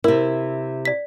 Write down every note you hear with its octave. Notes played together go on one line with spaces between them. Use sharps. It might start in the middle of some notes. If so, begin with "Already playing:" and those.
C3 E4 A#4
D5 B6